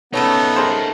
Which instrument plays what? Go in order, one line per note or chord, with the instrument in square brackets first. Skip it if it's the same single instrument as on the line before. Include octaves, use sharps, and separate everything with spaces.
[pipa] C#3 A3 C#5 [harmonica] B3 [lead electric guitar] D#4 A4
[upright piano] G#4 A#4 C5